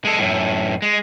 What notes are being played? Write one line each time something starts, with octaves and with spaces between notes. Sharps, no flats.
G#3 A4
F#2 A2
G#3